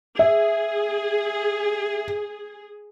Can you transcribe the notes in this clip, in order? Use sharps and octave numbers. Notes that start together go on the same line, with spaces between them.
G#4 E5